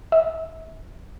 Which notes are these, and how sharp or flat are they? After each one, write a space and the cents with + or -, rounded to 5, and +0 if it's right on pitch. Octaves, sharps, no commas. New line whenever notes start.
E5 -30